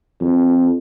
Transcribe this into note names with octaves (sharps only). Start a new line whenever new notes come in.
F2